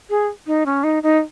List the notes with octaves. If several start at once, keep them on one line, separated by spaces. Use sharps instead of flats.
G#4
D#4
C#4
D#4
D#4